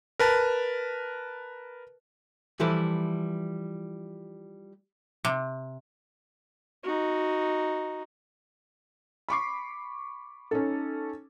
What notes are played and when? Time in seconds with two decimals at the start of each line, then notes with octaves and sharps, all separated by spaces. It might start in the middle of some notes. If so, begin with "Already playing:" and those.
0.19 A#4 B4 A5
2.60 E3 F3 G3 E4 A4 B4
5.25 C3
6.84 D#4 F#4
9.29 B5 C#6 D6 C7
10.51 C#4 D#4 A4